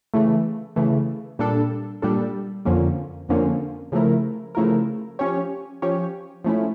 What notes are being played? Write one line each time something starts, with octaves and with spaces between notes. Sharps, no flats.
C#3 E3 A3
C#3 E3 A3
A#2 G3 D4 A4
A#2 G3 D4 A4
F2 D3 F3 A#3 C#4
F2 D3 F3 A#3 C#4
C#3 F3 A3 E4 A#4
C#3 F3 A3 E4 A#4
F3 C#4 G4 C#5
F3 C#4 G4 C#5
F3 A3 C#4 E4